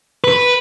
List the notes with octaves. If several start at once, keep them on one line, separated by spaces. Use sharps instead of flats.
B4